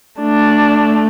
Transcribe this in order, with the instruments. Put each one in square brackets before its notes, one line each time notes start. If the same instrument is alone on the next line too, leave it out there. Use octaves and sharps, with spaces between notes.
[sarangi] A3 [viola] D4